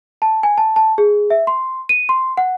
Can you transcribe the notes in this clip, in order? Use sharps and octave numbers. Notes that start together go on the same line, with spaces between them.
A5
G#5
A5
A5
G#4
E5
C6
D#7
C6
F#5